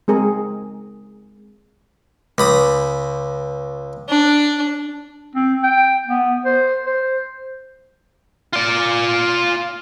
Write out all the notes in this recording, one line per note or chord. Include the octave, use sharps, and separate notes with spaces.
G#3 C4 G#4 A#4
C#2 B5 D#6
D4
C4
G5
B3
C5
C5
F4 D5